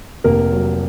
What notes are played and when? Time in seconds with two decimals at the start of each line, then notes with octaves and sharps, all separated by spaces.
0.24 F1 A#3 A#4
0.52 F#3